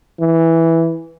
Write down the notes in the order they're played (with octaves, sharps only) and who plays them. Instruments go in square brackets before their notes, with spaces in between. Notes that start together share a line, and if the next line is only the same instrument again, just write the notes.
[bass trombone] E3